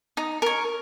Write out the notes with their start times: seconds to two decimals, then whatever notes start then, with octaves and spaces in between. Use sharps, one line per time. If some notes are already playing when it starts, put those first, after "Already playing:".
0.17 D#4
0.42 A#4 C#5